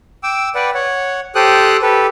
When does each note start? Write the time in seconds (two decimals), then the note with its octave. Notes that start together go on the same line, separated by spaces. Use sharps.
0.23 G5 D6 E6
0.55 B4 D5 F#5 G5
0.74 C#5 F#5
1.35 G4 A4 C5 G5 D#6 F#6
1.82 G4 A4 B4